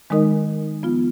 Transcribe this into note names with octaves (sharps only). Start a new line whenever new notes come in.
D#3 G#3 D#4 A#4 D#5
F3 B3 F4